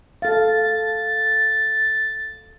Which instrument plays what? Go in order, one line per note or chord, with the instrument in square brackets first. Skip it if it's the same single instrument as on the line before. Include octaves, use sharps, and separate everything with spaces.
[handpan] A4 F5 [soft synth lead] A6